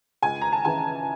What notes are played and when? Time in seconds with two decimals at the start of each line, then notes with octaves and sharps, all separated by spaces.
0.22 C#2 G#5
0.41 A#5
0.52 A5
0.65 C#3 E3 G#5